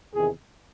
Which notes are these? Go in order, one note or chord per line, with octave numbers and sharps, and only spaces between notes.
E2 C3 D#3 G#4